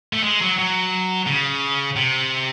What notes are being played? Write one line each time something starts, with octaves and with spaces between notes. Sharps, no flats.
A3
G#3
F#3
F#3
C#3
C3